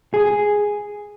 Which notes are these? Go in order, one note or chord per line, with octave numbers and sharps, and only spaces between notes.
G#4